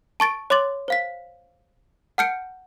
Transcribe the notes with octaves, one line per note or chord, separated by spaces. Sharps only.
A5 C#6 A6 D7
C#5 C6 D6 A6 F#7
C5 F5 B6
F#5 A5 F6 G6 C#7 D7